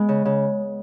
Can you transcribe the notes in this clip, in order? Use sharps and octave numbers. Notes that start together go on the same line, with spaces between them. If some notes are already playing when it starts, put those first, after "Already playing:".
Already playing: G#3 B3
C#3
C#3